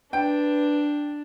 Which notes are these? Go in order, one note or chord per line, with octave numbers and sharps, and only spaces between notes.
D4 B4 G5